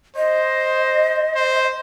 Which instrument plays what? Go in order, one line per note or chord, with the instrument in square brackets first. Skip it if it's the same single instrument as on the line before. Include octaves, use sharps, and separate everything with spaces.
[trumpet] C5 [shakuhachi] D#5
[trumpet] C5